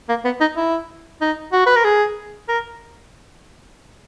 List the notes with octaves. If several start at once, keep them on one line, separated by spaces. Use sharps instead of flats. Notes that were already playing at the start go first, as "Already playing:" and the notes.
A#3
B3
D#4
E4
D#4
F#4
B4
A#4
G#4
A#4